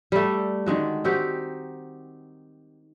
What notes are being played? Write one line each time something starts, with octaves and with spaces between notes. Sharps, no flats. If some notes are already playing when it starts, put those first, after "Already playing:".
G3 A3
D3 D#3 G#3 F#4
C4 D#4 F#4 G4